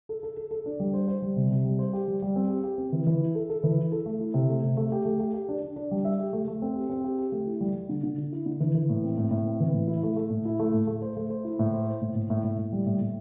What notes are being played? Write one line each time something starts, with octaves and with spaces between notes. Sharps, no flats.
A4
A4
A4
A4
D4
G3
C5
C5
G3
C3
C3
G3
C5
G4
G3
G3
C4
G4
G4
C4
E3
E3
E4
A4
A4
E3
E4
A4
A3
E4
C3
A3
C3
A3
G4
A3
G4
G4
D4
D4
D4
G3
E5
G4
A3
A3
C4
G4
C4
G4
G4
A3
E4
G3
G3
D3
D3
D3
E4
D3
E3
E3
A2
C4
A2
A2
C4
E3
A2
E4
A3
A3
A2
E4
A3
A2
A3
C5
A3
C5
E4
A2
C5
C5
A2
A2
A2
A2
A2
G3
A2
A2